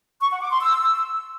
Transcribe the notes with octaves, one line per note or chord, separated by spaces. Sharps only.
C#6
F#5
D6
C6
E6